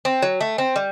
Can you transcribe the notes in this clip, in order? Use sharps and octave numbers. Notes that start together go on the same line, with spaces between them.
C4
F#3
A3
C4
G3